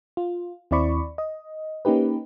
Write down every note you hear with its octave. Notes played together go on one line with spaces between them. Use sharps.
F4
D#2 C4 E4 D5 B5 C#6
D#5
A#3 C#4 D#4 G4 B4